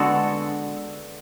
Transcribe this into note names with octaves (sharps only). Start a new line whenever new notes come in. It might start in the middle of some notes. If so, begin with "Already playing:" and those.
Already playing: D3 G#3 B3 F#4 A4